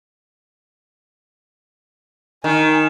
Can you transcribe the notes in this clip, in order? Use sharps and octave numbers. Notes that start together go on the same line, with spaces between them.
D#3 G#5